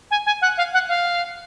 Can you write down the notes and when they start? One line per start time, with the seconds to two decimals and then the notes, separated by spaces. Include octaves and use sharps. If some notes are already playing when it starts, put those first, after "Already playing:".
0.11 G#5
0.26 G#5
0.42 F#5
0.57 F5
0.74 F#5
0.88 F5